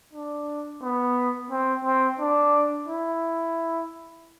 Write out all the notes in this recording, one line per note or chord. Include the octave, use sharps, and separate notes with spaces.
D4
B3
C4
C4
D4
E4